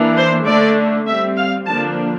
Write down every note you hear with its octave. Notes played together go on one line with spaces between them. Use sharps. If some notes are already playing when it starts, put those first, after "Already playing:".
Already playing: E3 A#3 D4
C5
D3 A3 D4 D5
G3 C4 E5
F5
D3 F3 A#3 D4 A5